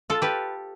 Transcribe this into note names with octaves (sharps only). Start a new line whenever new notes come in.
F4 A4
G4 B4